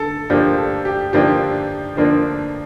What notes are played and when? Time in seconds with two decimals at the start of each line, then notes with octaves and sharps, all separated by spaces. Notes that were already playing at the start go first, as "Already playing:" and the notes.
Already playing: D3 A4
0.30 D3 F3 A#3 D4 G4
0.58 A4
0.85 G4
1.13 D3 F3 A#3 D4 G4
1.96 D3 F3 A#3 D4